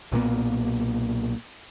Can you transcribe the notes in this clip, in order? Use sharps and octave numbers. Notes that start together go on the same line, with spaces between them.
B1 A#2 A#3 B3